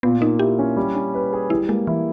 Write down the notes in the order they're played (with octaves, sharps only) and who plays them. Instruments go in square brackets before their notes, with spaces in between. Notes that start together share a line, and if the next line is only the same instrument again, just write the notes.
[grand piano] A#2 [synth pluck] B3
[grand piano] A#3 [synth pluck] D#4
[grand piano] E4 [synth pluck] G4
[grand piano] C#4
G3
C#4
B4
G#4
[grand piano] G3 [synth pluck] E4
[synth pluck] G#3 [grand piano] A#3
[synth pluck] E3 [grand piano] E4